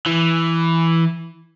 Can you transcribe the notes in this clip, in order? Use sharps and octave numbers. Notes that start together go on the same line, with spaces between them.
E3